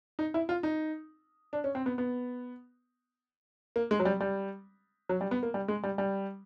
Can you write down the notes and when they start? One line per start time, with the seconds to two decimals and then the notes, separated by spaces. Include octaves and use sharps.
0.19 D#4
0.34 E4
0.49 F4
0.63 D#4
1.53 D4
1.64 C#4
1.75 C4
1.86 B3
1.98 B3
3.76 A#3
3.91 G#3
4.00 F#3
4.05 G3
4.20 G3
5.09 F#3
5.21 G3
5.31 B3
5.43 A#3
5.54 G3
5.68 G#3
5.83 G3
5.98 G3